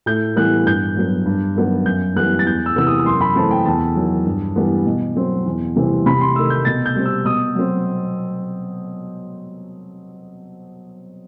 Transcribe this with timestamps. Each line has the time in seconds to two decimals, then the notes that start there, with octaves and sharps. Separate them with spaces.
0.06 A2 G6
0.36 E3 G3 B3 F#6
0.66 G2 G6
0.97 F#3 B3
1.26 G2
1.56 D#3 F#3 B3
1.86 F#2 G6
2.16 E3 G3 B3 F#6
2.39 A6
2.46 E2 G6
2.66 E6
2.76 C3 E3 B3 E6
2.87 D#6
3.00 D#6
3.06 F#2 C6
3.21 B5
3.35 E3 A3 C4 A5
3.51 G5
3.65 E2 A5
3.96 D#3 F#3
4.26 G2
4.56 E3 G3 B3
4.86 B2
5.16 F#3 C4
5.46 E2
5.76 C3 E3 G3 C4
6.06 C3 B5
6.21 C6
6.36 D#3 A3 E6
6.50 G6
6.65 B2 A6
6.86 G6
6.95 G3 C4
7.05 E6
7.25 B2 D#6
7.55 F#3 C4